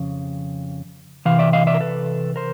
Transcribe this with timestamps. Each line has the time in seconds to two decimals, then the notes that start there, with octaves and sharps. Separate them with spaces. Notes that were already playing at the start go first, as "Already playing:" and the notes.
Already playing: F2 C#3
1.25 C3 E3 F5
1.39 D5 E5
1.53 D#5 F5
1.67 D5 E5
1.74 A#4
1.81 A4 B4
2.36 A#4 C5